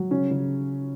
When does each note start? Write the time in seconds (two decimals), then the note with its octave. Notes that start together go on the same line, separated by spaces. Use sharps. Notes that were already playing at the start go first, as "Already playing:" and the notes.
Already playing: F#3
0.11 C#3 C#4
0.31 C#3